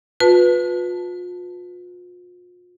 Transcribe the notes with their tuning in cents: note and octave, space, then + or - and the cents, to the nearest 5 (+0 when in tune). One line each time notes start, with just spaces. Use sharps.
F4 +40 B4 +0 A5 +0